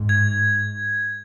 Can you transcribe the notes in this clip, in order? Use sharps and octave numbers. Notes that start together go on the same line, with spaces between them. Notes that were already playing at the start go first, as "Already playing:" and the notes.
Already playing: G#2
G#6